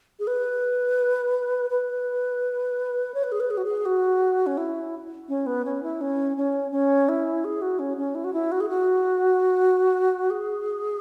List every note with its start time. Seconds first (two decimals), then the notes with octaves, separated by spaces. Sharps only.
0.20 G#4
0.27 B4
1.70 B4
3.14 C#5
3.23 B4
3.32 G#4
3.40 B4
3.51 G#4
3.57 F#4
3.65 G#4
3.85 F#4
4.46 C#4
4.57 E4
5.29 C#4
5.46 B3
5.65 C#4
5.83 E4
6.01 C#4
6.37 C#4
6.72 C#4
7.09 E4
7.45 G#4
7.62 F#4
7.79 C#4
7.97 C#4
8.15 E4
8.24 F#4
8.34 E4
8.52 F#4
8.60 G#4
8.69 F#4
10.30 G#4